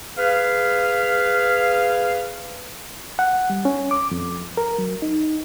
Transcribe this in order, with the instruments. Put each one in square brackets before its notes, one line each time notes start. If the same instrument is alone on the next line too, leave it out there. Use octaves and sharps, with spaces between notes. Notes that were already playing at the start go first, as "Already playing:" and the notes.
[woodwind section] G#4 B4 F5
[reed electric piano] F#5
G3
C#4
D6
F2
A#4
F#3
D#4